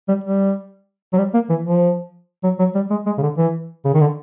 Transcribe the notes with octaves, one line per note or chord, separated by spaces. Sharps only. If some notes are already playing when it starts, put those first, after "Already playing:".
G3
G3
F#3
G3
A#3
E3
F3
F#3
F#3
G3
G#3
G#3
C#3
D3
E3
C#3
D#3
D3